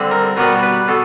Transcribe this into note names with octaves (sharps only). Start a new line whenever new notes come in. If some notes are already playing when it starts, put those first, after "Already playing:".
Already playing: D3 G3 C4
A#4
B2 G3 B3 A#4
B4
B2 A4